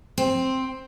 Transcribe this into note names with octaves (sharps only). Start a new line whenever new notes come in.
C4